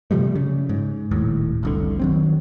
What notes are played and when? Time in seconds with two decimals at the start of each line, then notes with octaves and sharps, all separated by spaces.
0.11 C3 F3 G3 A3
0.35 C#3
0.69 G#2
1.11 D#1 D#2 A2
1.63 F1 C2 D3
1.99 D#3 F#3 C4